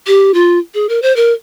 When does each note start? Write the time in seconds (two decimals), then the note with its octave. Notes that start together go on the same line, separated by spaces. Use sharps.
0.07 G4
0.34 F4
0.74 G#4
0.89 A#4
1.02 C5
1.16 A#4